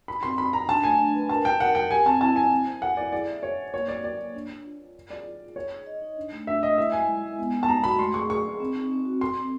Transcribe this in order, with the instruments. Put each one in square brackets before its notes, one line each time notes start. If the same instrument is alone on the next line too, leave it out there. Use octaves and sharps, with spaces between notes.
[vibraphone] D#4 [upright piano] B5
[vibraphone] C4 [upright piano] C6
[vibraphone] D#4 [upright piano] B5
[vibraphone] D#4 [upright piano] A#5
[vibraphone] D4 [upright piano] A5
[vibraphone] A3 [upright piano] G#5
[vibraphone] D4
B4
[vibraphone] A#4 [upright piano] A5
[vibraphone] D#4 [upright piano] G5
[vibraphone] A#4 [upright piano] F#5
[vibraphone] A#4 [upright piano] G5
[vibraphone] G4 [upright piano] G#5
[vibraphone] C4 [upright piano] A5
[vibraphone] E4 [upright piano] A5
[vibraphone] C4 [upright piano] G#5
[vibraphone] E4
C5
[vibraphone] A4 [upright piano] F#5
[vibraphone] E4 [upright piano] D5
[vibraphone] G#4 [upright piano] D5
[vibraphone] E5
[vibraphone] C5 [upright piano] C#5
[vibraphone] D#4
[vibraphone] A#3 [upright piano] C#5
[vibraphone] F#4 [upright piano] D5
[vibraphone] A#4 [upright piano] D5
[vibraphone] A#3
D4
D4
F4
F4
F4
[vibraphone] G#4 [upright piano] D5
[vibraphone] F4
G#4
[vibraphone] D#4 [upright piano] C#5
[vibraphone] G#4
D#5
D#4
D4
A3
[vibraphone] D4 [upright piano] E5
[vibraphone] A3 [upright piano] D#5
[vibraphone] E4 [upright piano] E5
[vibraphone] G#3 [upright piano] G#5
[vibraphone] E4
G#3
B3
D#4
[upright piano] A5
[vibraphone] G#3 [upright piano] A#5
[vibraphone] F#4 [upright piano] B5
[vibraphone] A3 [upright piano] C6
[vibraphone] G#4 [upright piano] C#6
[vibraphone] G#4 [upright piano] C#6
[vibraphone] G#4
C4
D#4
C4
F#4
[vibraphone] A4 [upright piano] C6
[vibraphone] C4